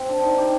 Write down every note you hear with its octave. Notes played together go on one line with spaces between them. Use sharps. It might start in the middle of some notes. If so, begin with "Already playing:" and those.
Already playing: C4 G4 C5
D4
D#4
G4